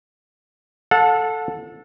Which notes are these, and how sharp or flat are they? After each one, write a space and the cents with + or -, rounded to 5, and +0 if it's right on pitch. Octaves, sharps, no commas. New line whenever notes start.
A4 +0 F#5 -40